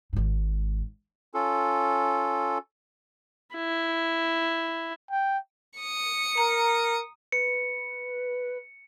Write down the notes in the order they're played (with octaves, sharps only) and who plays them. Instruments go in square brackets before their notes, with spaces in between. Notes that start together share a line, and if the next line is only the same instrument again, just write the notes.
[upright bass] G#1 G#2
[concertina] C#4 F4 A4
[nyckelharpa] E4
[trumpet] G5
[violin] D#6 C#7
[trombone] A#4 [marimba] A#5
[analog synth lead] B4 [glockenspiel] C#7